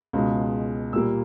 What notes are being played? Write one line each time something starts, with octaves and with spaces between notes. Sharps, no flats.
C#2 B2 G#3
A#2 G3 A#3 E6